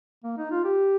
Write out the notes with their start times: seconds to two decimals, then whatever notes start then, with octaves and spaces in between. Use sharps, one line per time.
0.24 A#3
0.38 D#4
0.51 F4
0.64 G4